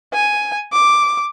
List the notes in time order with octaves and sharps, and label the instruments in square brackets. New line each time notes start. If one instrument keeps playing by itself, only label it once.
[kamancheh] G#5
D6